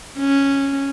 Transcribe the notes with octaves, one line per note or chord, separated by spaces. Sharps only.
C#4